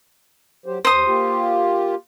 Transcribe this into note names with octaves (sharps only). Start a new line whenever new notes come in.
F#3 G4 C5
D#2 C5 D#6
A#3 F4 G4